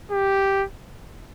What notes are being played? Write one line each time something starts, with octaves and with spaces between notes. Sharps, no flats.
G4